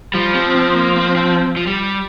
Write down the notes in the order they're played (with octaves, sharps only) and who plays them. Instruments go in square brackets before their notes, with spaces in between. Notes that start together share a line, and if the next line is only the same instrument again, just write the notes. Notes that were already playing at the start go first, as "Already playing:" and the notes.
[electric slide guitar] F3 [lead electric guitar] G3
[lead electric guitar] C4
C4
A#3
C4
C4
F3
G3